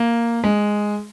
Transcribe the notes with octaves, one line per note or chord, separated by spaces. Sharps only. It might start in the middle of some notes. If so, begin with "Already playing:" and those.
Already playing: A#3
G#3